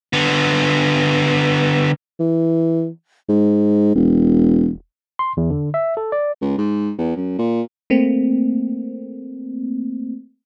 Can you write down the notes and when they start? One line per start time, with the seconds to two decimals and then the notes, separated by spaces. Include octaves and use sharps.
0.13 D3 B3
2.20 E3
3.28 G#2
3.95 E1
5.19 C6
5.37 E2
5.50 D3
5.74 E5
5.97 A4
6.12 D5
6.41 C#2
6.58 G#2
6.98 E2
7.16 F#2
7.39 A#2
7.90 A3 A#3 C4